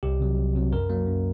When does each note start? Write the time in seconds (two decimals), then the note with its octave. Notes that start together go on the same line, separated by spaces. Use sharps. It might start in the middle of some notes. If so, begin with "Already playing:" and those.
0.03 C2 G4
0.20 C3 F#3
0.37 C2
0.55 C3 F#3
0.72 F#2 A#4
0.90 F#3 A#3
1.07 F#2